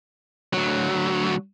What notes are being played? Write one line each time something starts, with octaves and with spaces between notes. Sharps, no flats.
D2 F#3